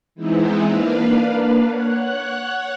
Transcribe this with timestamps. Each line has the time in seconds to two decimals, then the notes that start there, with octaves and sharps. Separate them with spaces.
0.15 E3 G#3 B3 C4 D#4 E4
0.65 A#3 D4 B4 F5
1.66 C#5 F#5 F#6